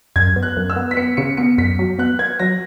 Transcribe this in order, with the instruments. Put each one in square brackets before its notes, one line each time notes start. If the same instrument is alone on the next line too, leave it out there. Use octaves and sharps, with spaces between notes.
[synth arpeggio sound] F#2 [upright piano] G#6
[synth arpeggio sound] B3
[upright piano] F#6
[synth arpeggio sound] F#2
[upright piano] E6
[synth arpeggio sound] B3
[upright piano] B6
[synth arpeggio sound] B3 [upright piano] C#7
[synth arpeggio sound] C#3 [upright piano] C#7
[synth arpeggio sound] B3 [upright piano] C#7
[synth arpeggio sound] F#2 [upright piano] B6
[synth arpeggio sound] F#3
[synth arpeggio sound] B3 [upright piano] F#6
[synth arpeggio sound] B3 [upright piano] G#6
[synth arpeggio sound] F#3 [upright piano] A#6